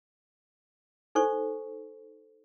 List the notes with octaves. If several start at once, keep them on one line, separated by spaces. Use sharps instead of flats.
D#4 A4 C5 C#6